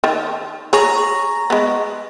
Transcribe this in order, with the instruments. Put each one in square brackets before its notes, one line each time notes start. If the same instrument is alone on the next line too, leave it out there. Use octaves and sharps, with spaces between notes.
[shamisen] D#3
[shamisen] G#4 C#5 [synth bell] A#5 C#6 A#6
[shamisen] G#3 B3